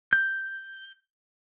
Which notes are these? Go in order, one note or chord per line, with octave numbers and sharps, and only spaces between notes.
G6